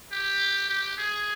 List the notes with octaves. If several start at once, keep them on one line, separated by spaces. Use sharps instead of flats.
G4
G4
G#4